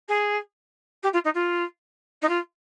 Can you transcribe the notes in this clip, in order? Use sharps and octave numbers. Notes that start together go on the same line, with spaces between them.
G#4
G4
F4
D#4
F4
D#4
F4